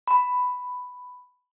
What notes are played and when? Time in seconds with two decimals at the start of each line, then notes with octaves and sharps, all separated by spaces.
0.08 B5